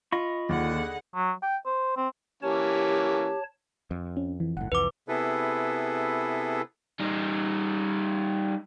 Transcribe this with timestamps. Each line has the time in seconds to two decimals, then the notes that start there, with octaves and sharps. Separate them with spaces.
0.12 F4 D#5 B5 C#6
0.49 D#2 D3 G#4 F#5
1.15 F#3
1.42 G5
1.66 C5
1.96 C4
2.43 E3 A#3 C#4 G4 C#5 A5
3.91 F2
4.17 C#4
4.40 E3
4.57 F#1 A2 F#5
4.72 C2 F2 E3 B4 D6
5.08 C3 B3 E4 G#4 A4 B4
7.00 G3 D#4